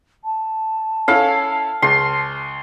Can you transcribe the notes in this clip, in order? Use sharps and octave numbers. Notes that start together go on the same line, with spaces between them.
A5
C#4 E4 A4 F5
C#2 C6